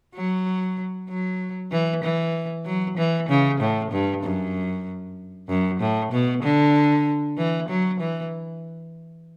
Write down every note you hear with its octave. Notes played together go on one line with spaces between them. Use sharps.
F#3
F#3
E3
E3
F#3
E3
C#3
A2
G2
F#2
F#2
A2
B2
D3
E3
F#3
E3